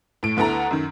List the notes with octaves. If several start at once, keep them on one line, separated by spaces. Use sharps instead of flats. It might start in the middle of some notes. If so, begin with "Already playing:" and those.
A2 D7
D2 B3 E4 A4 A#5
F#2 D#3